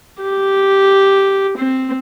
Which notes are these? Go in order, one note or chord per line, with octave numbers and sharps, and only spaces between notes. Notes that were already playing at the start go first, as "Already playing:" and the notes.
G4
C4